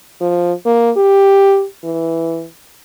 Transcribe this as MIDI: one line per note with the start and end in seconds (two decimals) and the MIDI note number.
0.21 0.53 53
0.65 0.91 58
0.97 1.64 67
1.84 2.46 52